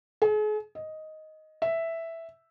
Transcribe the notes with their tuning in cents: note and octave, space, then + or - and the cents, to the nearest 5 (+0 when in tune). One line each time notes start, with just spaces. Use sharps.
G#4 +40
D#5 +5
E5 +0